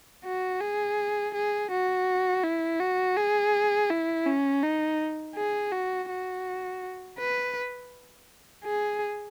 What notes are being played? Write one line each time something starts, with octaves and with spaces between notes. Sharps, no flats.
F#4
G#4
G#4
F#4
E4
F#4
G#4
E4
C#4
D#4
G#4
F#4
F#4
B4
G#4